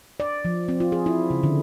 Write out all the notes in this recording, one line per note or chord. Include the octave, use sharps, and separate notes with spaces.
D5
F3
C4
F4
G#4
E4
C#3
D3